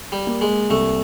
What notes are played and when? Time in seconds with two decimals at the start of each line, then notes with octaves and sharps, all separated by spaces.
0.12 G3
0.27 A#3
0.41 G#3
0.70 C2 A3